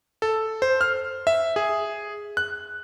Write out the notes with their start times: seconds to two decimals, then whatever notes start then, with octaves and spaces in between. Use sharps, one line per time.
0.22 A4
0.62 C5
0.81 F6
1.27 E5
1.56 G#4
2.37 F#6